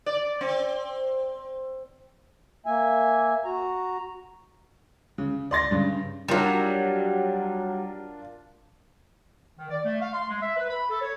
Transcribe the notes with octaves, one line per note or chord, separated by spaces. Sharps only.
D5
C4
A#3 E5 G#5
F#4 A#5
C#3
D5 C6 A6 A#6
G2 C#3
F#3 G3 D4 F4 A#4
D#3
D5
A3
F5
C6
G#3
E5
B4
B5
A4
C#5